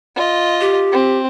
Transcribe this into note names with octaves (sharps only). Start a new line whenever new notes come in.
F4 D#5
G4
C4